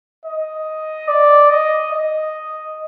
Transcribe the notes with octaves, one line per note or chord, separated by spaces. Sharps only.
D#5
D5
D#5
D#5